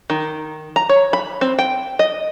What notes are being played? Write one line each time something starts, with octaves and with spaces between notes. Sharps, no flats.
D#3
A#5
C#5
B5
C4
G5
D#5